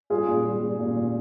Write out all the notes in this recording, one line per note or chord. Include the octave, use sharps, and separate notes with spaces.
G3 F4 G#4
A#2
G3
G3
A#2
A#2